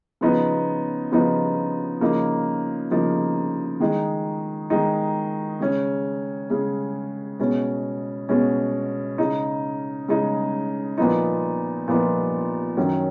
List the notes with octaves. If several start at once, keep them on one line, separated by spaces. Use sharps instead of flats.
C#3 F3 B3 D#4
C#3 F3 B3 D#4
C#3 F3 A#3 D#4
C#3 F3 A#3 D#4
D#3 G#3 D#4
D#3 G#3 D#4
C#3 G#3 C#4
C#3 G#3 C#4
B2 G#3 C#4
B2 G#3 C#4
C#3 G#3 D#4
C#3 G#3 D#4
A#2 F3 B3 D#4
A#2 F3 B3 D#4
F#2 D#3 F#3 C#4